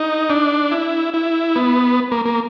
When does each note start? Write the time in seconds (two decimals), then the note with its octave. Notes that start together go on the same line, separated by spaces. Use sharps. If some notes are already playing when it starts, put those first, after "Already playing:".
Already playing: D#4
0.30 D4
0.71 E4
1.14 E4
1.56 B3
2.11 A#3
2.25 A#3